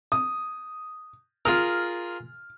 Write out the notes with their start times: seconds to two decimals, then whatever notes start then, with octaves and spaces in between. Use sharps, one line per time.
0.12 D#6
1.45 F4 G#4 A#4 F6